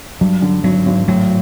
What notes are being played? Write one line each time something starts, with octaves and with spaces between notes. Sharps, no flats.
G2 F#3
D3
G#1 F#3
G#1
A2 F#3